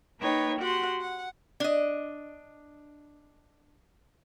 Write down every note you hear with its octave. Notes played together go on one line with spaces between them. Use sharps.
A#3 D#4 B4 C#5 G5
F#4 G4 F#5 C6
F#5
D4 D#5